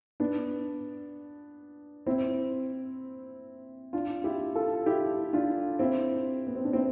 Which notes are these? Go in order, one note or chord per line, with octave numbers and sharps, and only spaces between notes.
B3 D4
C4 E4
D4 F4
E4 G4
F4 A4
E4 G4
D4 F4
C4 E4
B3
C4
D4
C4 E4